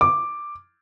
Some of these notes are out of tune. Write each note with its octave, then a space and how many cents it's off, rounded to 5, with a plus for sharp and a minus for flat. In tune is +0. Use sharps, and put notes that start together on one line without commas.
D6 +5